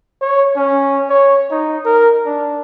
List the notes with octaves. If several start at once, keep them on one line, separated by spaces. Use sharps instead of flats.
C#5
C#4
C#5
D#4
A#4
D4